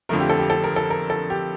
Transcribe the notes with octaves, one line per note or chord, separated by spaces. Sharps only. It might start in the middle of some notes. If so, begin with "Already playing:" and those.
F2 D3 F3 A3 A#4
G4
A4
G4
A4
A#4
A4
A#4
A4
G4